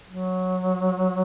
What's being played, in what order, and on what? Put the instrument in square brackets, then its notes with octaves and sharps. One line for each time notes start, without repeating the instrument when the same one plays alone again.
[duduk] F#3